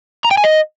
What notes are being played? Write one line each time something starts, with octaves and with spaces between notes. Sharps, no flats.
A#5
G5
G#5
D#5